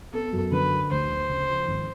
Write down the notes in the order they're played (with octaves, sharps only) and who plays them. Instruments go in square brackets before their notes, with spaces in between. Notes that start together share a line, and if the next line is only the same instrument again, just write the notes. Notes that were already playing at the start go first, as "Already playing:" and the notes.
[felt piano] B3 [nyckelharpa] A4
[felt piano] F#2
[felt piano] D3 [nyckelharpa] B4
[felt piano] F#3
[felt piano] D2 [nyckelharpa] C5
[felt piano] D2
C#3
F3
G#1